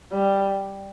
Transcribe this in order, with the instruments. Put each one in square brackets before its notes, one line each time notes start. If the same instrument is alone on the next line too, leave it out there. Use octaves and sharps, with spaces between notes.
[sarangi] G3